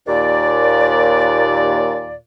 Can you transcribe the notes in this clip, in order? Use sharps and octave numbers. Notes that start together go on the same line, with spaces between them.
D#2 A#2 D5